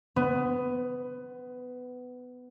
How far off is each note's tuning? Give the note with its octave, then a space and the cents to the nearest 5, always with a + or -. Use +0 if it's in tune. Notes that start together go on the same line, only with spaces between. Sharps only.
B3 +15